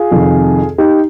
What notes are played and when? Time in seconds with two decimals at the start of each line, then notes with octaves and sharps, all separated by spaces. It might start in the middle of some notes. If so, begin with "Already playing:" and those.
Already playing: F4 G#4
0.11 F2 C3 D#3
0.78 D#4 G4